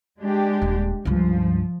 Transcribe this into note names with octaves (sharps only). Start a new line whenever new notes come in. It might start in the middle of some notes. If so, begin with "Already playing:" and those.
G#3 D4 G4
D#1
C#2 G2 F3